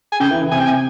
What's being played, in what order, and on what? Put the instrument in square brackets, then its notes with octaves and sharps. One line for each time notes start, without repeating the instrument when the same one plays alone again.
[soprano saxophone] G#5
[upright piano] C#3 [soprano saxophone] G5
[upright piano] E3
E3
[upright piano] C3 [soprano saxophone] G#5
[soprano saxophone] G5
[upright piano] C3 [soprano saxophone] G#5